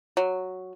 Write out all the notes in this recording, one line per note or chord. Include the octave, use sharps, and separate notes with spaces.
F#3